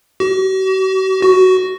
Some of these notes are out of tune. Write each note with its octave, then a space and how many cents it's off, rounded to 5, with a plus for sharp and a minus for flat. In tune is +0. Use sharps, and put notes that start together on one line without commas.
F#4 +45
F#4 +10